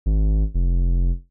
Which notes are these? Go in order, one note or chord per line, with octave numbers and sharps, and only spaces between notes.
G#1
F1